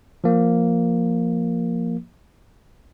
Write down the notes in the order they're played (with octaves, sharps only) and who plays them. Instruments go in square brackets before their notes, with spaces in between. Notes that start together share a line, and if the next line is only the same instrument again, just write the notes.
[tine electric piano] F3 A#3